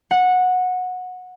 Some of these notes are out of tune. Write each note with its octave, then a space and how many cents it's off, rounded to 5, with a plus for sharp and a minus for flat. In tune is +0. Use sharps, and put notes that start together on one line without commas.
F#5 -15